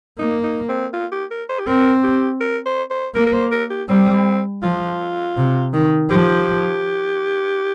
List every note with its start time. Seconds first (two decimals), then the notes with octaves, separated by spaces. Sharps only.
0.19 A#3 D#4
0.43 D#4
0.69 C4
0.93 F4
1.12 G4
1.31 A#4
1.49 C5
1.59 G4
1.67 C4 A#4
2.03 G4
2.40 A#4
2.66 C5
2.90 C5
3.14 A#3 A#4
3.26 A#4
3.33 C5
3.51 A#4
3.70 G4
3.89 G3 C4
4.63 F3 F4
5.37 C3
5.73 D#3
6.10 F3 G4